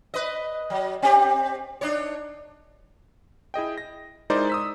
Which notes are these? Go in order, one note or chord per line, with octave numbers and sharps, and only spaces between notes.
B4 D#5
F#3
C4 G4
D4 D#4 C#5
E4 G#4 D#5 G5
A#6
G#3 D#4 E4 A#4 C5 D5
D#6 E6 B6